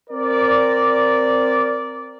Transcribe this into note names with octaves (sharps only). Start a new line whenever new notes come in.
C4 A#4 D5